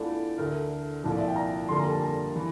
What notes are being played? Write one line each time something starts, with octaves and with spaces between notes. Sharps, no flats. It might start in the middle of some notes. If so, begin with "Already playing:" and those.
Already playing: E2 E3 A3 D4 F4 D5
D2 D3 A3 A#4
C2 A#2 F3
D5
E5
G5
A#5
G1 F2 D3 G3 A#3 C6
A#5
A5
A#5
E3